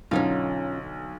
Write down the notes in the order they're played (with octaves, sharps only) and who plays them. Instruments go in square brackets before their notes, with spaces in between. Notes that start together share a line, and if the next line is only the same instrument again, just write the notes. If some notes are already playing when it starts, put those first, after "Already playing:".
[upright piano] B1 D3 [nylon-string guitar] C#4 D#4 F4